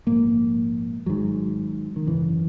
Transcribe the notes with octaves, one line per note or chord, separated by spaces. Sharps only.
A#1 G#2 A#3
G#1 G#2 F#3
D#3
G#1 F#2 C#3 E3